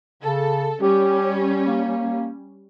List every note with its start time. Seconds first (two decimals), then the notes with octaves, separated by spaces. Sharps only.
0.23 C#3 A4
0.81 G3 C#4 G4
1.67 A#3